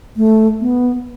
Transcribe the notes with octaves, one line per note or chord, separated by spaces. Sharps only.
A3
B3